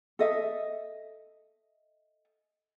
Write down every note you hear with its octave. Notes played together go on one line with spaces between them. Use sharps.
A4 D#5 E5